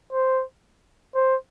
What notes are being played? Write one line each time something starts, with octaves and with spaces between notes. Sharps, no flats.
C5
C5